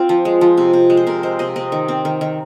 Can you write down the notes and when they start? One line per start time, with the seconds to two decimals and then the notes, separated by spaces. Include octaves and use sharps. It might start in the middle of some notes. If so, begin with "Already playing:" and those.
Already playing: C4 F4
0.09 F3
0.25 G#3
0.41 F3
0.57 C3
0.73 C3
0.90 G#3
0.97 C5
1.07 C3 A#4
1.23 G#3 C5
1.39 C3 D#5
1.56 C4 D#5
1.72 D#3
1.88 C4
2.05 D#3
2.21 D#3